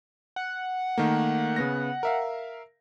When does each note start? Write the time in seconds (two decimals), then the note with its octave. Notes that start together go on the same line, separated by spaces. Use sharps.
0.36 F#5
0.98 D#3 A3 A#3
1.56 C#3 B3 A#6
2.03 A#4 E5 F5